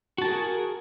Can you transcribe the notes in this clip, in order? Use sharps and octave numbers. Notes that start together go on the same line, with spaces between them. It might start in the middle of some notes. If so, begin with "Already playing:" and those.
F#4 G#4 A#4 A5